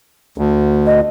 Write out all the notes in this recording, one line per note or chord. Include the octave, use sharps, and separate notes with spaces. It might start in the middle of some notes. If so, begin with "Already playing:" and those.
D2
D#5